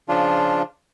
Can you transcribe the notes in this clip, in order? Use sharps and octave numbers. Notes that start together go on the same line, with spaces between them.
C#3 F3 D4 F4